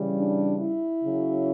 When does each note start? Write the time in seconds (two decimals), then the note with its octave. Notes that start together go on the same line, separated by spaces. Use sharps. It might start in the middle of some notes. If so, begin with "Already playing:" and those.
Already playing: C#3 E3 G3
0.15 D4
0.59 E4
1.04 C#3 F#3